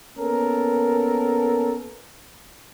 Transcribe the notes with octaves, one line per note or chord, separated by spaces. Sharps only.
A#3 B3 C#4 A4 A#4